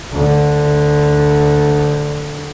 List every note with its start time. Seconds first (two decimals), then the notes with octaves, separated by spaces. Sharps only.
0.12 D2 D3